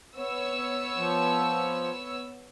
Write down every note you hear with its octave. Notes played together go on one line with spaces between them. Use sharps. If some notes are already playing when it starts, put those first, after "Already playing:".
B3 C#5 E6
F3